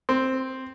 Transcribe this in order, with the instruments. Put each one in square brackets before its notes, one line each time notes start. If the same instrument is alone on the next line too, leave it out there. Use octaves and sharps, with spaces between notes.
[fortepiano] C4